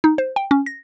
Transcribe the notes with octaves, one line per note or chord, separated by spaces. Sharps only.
D#4
C5
G5
C#4
A#6